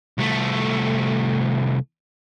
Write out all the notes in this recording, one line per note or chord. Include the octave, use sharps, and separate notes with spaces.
C2 A3